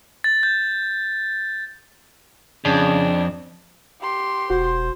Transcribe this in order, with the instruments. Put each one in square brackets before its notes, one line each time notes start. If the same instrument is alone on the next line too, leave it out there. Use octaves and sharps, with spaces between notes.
[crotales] A6
G6
[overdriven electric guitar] F2 [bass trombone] C#3 [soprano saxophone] D4
[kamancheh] G4 C6
[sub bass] E1 [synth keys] F#4 [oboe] C5